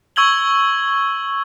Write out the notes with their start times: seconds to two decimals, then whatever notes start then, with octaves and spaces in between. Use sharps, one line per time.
0.16 C#6 E6 G#6 F#7 G7